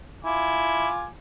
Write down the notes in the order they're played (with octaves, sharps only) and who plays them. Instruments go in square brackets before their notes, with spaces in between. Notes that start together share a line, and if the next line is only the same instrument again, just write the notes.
[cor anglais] E4 [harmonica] F4 G#5 D6